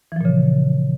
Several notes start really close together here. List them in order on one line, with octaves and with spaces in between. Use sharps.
E3 F3 A#2 C#3